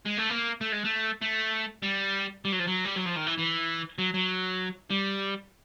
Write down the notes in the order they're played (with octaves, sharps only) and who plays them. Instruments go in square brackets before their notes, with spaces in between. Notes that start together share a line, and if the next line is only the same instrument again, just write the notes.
[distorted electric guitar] G#3
A3
A#3
A3
G#3
A3
A3
G3
G3
F#3
F3
F#3
G3
F#3
F3
D#3
E3
E3
F#3
F#3
G3